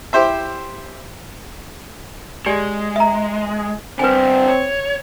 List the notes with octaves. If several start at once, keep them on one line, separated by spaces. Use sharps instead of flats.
E4 G4 C5 E5
G#3 G4 D5 G#5
E5 A#5
D3 G3 C4 B4 G#5
C#5